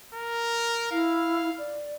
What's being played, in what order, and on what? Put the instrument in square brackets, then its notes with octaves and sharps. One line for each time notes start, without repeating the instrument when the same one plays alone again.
[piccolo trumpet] A#4
[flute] E4 [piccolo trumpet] F5
[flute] D5